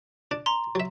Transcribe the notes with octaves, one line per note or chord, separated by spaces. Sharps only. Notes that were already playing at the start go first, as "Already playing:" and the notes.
D4
A#5 C6
F#3 E5